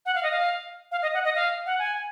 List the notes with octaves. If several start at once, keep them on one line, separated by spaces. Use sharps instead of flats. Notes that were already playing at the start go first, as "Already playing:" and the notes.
F#5
F5
D#5
F5
F5
D#5
F#5
D#5
F5
F#5
G#5